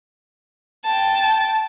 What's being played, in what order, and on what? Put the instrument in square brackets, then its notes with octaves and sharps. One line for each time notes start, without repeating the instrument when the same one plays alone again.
[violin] G5 A5